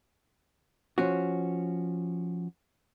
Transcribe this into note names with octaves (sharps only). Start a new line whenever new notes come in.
F3 C#4 F#4